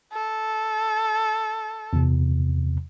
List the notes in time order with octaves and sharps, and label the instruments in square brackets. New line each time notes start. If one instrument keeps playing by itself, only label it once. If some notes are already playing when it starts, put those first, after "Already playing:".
[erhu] A4
[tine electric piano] E2 C3